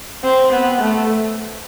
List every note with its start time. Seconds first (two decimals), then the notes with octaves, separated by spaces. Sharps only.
0.24 C4
0.52 B3
0.81 A3